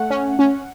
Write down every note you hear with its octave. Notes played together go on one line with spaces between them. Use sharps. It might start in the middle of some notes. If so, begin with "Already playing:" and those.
Already playing: A3 F#5
C#4
C#4